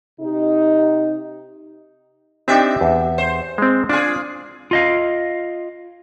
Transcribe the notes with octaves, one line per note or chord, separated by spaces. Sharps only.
C3 D#4 G4
C4 D4 D#4 G4 E5
E2
C5
G#3 C4
D4 F4 G#4
F4 D#5 F5